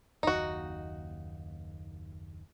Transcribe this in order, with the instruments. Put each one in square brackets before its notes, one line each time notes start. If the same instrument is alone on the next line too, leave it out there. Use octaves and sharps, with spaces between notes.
[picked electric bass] F#1 D#2 [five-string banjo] D#4 F#4